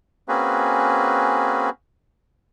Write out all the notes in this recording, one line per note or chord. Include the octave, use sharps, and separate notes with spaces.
A#3 C4 C#4 F#4 G#4 B4